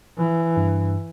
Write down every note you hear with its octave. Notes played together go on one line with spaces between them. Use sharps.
E3
G2